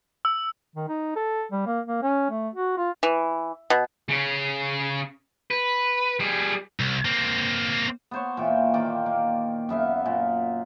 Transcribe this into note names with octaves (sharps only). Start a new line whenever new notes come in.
E6
D#3
D#4
A4
G3
A#3
A#3
C#4
A3
F#4
F4
E3
B2
C#3 C#4
B4
G3 G#4
C2
A#3 C4
B3 C5 C#5
A#2 E3 G5
D#3 A#3 D5 G5
A#3
F#2 B3 E5 F5
A#2